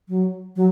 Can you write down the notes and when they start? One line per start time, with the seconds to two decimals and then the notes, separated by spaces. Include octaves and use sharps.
0.09 F#3
0.56 F#3